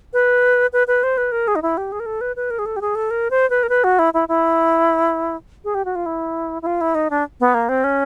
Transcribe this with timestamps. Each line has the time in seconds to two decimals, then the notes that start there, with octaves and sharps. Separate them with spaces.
0.13 B4
0.73 B4
0.87 B4
1.03 C5
1.17 B4
1.32 A#4
1.48 G#4
1.56 D#4
1.62 E4
1.77 G4
1.92 G#4
2.00 A#4
2.06 A4
2.21 B4
2.36 B4
2.50 A#4
2.59 G#4
2.66 A4
2.76 G4
2.81 G#4
2.95 A4
3.11 A#4
3.31 C5
3.50 B4
3.63 A#4
3.69 B4
3.84 F#4
3.99 E4
4.14 E4
4.29 E4
5.64 G#4
5.75 G4
5.85 F#4
5.95 F4
6.06 E4
6.62 E4
6.66 F4
6.81 E4
6.95 D#4
7.10 D4
7.40 B3
7.54 A#3
7.69 C4
7.84 C#4